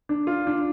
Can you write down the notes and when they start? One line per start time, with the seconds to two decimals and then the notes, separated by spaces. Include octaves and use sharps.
0.09 D4
0.27 F4
0.47 D4